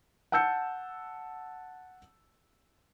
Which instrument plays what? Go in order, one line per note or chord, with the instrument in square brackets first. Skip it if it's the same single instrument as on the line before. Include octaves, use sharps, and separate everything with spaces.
[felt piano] F#5 A5 E6 G6 C#7